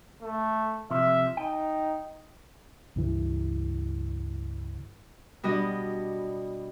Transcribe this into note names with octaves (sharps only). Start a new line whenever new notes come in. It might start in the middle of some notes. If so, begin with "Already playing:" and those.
A3
C3 F3 E5
D#4 G5
C#2 G2 E3
B2 G3 D4 D#5